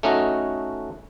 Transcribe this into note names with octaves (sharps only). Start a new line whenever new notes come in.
A3 C#4 D#4 F#4 D#5